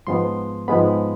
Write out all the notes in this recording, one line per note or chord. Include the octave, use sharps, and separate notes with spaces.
G#2 F3 G#3 B3 C6
G#2 F3 G#3 B3 B5